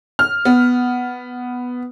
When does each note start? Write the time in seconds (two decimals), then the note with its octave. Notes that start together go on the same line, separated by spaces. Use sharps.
0.19 F6
0.45 B3